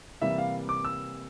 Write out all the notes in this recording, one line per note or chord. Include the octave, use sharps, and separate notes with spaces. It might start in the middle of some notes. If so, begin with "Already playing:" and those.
C3 E3 G3 A#3 E5
F5
D6
E6